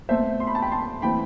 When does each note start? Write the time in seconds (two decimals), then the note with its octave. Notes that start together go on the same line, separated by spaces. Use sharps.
0.09 B2 A3 C4 C5 E5
0.40 C6
0.47 B5
0.55 A5
0.62 G5 B5
0.71 A5 C6
1.02 E3 A3 C4 G5 B5